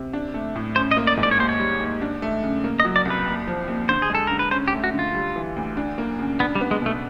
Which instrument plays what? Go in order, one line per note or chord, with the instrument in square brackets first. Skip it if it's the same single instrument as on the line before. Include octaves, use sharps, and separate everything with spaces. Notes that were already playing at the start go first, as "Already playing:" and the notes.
Already playing: [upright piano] C3
D4
A3
A2
[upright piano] C#4 [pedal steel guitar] C5
[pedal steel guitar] D#5
[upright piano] A#3
[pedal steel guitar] D5
[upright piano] G#2
[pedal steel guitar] D5
C#5
[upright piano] D#2 [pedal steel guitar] C5
[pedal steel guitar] C#5
[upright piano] G3
D#2
D4
A3
C#3
A#3
[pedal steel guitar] D#5
[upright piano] F#3
[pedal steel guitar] D5
[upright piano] C2
[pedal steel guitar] B4
[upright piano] D#2
F3
D#2
[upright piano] D3 [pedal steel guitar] C5
[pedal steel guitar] G#4
[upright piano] G#3 [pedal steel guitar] A4
[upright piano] D3 [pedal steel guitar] A#4
[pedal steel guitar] B4
[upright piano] C#4 [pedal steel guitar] C5
[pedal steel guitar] G4
[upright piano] A3
[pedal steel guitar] F#4
[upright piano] D3
[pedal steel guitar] F4
[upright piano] G3
E3
D2
D4
A#3
C#3
[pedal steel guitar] B3 [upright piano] D4
[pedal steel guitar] G3
[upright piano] B3
[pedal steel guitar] G#3
[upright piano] B2 [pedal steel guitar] A3